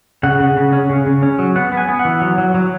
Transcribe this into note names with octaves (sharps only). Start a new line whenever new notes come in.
C#3 F#5
C#3
C#3
C#4
C#3
C#3
C#4
F#3
B3 F#5
B3
G#5
B3
F#5
E3
F#3
F#3
F#3